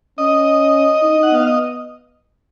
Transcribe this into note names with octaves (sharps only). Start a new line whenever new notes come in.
C#4 D#5
D#4
F#5
B3 F5
D#5